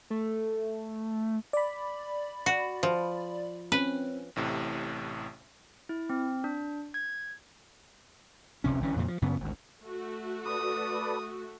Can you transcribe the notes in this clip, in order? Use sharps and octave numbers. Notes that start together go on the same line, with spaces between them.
A3
D5 B5
F#4
F3
C4 C#4 B4
A1 A2 C3
E4
C4
D4
G#6
F1 D2 C3 C#4
G1 E3 C#4
F2 A#2 C#3 E3
F3
F#2 C#3 B3
G#1 D2
A3 F#4
A4 B4 D5 D#6